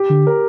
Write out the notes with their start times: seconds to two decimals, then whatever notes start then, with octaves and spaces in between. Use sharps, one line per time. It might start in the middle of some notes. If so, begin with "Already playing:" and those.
Already playing: G4
0.10 D3
0.27 A#4